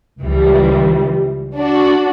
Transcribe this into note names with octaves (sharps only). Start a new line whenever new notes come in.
C#2 E3 F3 G3
D4 F#4